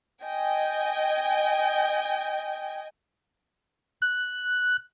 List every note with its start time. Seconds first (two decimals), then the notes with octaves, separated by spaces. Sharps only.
0.24 D#5 G5 G#5
4.02 F#6